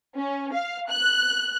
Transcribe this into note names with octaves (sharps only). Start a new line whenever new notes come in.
C#4
F5
F#6